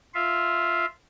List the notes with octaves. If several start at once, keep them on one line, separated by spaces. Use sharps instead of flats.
F4 E5 F5